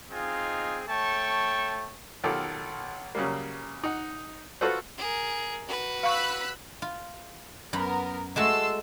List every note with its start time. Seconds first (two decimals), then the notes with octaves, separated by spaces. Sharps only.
0.11 C4 D#4 F4 G#4 D#5 G#5
0.88 A3 C#5 G5 A5 C#6
2.24 B1 D#3 F4 G4 A4
3.15 C#3 F#3 G3 A#3
3.84 D#4 F#5
4.61 F4 F#4 A4 B4 C5
4.98 G#4 A#4
5.67 F#4 B4
6.03 F5 B5 C#6 E6 F#6
6.82 F4
7.73 F#2 B3 A#4 A#5 B5
8.36 G#3 A3 F#4 A5 C6 E6